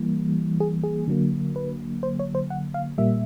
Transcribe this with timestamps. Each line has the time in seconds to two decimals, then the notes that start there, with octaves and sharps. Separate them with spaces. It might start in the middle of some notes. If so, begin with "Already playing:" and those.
Already playing: E3 G3 A#3
0.60 G#4
0.84 G#4
1.08 D3 F#3 A#3
1.56 B4
2.03 C5
2.20 C#5
2.35 C5
2.50 F#5
2.74 F5
2.98 A#2 G3 A#3 E5